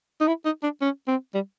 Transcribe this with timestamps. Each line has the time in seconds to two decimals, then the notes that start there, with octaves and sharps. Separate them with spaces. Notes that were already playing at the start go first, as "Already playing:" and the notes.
0.20 D#4
0.27 E4
0.45 D#4
0.63 D4
0.81 C#4
1.08 C4
1.34 G3